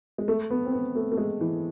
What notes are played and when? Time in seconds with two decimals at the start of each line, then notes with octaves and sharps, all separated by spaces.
0.18 G#3
0.28 A3
0.50 B3
0.65 C4
0.72 B3
0.95 A3
1.12 A3
1.17 G#3
1.41 E3